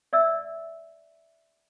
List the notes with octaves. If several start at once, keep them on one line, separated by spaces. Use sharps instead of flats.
D5 E5 E6